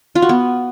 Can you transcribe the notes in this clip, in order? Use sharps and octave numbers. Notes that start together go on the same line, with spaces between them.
F4
F#4
B3